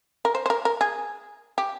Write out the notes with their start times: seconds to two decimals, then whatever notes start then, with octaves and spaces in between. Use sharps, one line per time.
0.25 A#4
0.35 C5
0.46 C5
0.50 A#4
0.65 A#4
0.81 G#4
1.58 G4